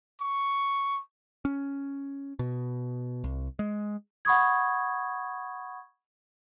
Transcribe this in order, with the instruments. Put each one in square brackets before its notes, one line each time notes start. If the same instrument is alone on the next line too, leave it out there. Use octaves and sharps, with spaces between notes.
[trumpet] C#6
[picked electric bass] C#4
B2
C2
G#3
[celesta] F#5 B5 C#6 D#6 G#6